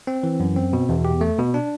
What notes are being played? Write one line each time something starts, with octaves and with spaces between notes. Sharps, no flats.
C4
E3
F#2
C4
B2
E2
G4
A3
B2
D4